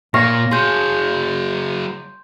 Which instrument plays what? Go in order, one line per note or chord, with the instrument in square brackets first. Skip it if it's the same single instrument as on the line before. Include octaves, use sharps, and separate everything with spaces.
[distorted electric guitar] A#2 A#3 [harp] C#5 F5 C#6 [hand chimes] A#6
[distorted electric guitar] F#3 G#4 [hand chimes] C6 G6